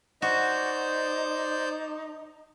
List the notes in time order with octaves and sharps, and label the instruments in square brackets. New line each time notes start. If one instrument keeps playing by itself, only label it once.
[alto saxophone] D#4 [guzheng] F#4 [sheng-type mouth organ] C5 D5 G6